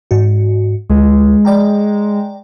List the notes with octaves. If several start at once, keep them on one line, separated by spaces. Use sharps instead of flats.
G#2 F#4
D2 G#3
D5 G5 A#5